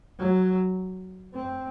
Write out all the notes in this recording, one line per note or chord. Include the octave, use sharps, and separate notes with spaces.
F#3
C4